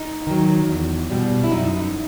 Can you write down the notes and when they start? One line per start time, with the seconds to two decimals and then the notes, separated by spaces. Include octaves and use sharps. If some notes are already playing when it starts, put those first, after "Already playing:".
Already playing: D#4
0.27 D#3 F#3
0.68 E2
1.10 B2 G3
1.44 E4
1.52 F#2 D#4